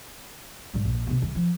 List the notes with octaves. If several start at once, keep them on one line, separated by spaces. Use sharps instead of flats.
G#2 G3
A#1
C3 B3
C2 D#3
F3